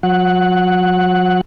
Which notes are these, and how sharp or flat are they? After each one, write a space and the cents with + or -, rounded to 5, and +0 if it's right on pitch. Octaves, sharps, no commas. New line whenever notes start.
F#3 -45 F#5 +0